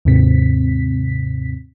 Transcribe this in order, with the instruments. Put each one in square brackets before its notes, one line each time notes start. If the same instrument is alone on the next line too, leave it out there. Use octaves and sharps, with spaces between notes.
[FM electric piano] D#2 G#2 C3 C4 B6